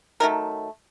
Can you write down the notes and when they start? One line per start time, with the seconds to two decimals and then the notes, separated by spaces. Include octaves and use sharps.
0.20 D#3 F#3 A3 A#4